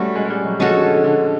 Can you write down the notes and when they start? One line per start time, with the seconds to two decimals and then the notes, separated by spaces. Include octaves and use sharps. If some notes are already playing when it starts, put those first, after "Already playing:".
Already playing: G3 A3 C#4 F#4
0.15 G#3
0.26 G#3
0.30 G3
0.45 F#3
0.59 F3 G#3 C#4 F#4 A4
0.71 D3
0.82 D3
0.93 D3
1.04 D3